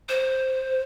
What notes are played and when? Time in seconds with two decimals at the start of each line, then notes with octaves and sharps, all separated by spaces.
0.09 C5